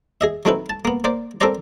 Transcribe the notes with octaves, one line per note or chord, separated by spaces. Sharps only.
G#4 D#5 E5
F#3 A3 C4 D#4 E4 B4
A5
A#3 B3
A#3 C5 D5
C4 A4 A#4 C5 D5 A#5